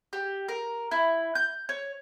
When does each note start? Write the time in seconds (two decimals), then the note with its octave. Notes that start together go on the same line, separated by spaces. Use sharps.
0.13 G4
0.48 A#4
0.91 E4
1.35 G6
1.69 C#5